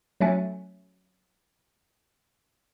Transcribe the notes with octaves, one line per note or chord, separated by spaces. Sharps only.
F#3 A3 C#4